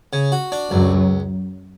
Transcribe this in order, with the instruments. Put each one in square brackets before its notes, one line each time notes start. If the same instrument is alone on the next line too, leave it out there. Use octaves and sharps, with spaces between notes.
[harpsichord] C#3
F#4
D4
[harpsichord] C#2 [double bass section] F#2 F#3